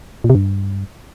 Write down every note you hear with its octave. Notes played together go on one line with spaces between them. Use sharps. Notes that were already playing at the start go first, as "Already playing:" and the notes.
A#2
C3
G2